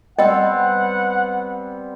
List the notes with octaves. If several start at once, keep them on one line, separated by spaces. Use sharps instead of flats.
G3 B3 C4 D#5 F#5 G5